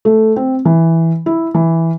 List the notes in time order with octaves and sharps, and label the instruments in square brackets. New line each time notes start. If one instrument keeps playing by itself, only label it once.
[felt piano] A3
C4
E3
E4
E3